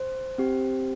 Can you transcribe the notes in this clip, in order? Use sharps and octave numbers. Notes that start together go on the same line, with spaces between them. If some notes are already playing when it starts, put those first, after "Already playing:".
Already playing: C5
C4 G4